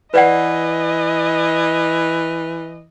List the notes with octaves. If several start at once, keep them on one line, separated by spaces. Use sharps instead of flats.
E3 B4 D5 D#5 F#5